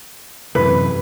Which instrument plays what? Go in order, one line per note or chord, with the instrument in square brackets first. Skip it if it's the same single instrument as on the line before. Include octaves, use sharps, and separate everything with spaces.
[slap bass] F#2 C3 E3 [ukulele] B4